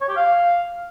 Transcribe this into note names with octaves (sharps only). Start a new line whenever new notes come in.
C#5
G4
F5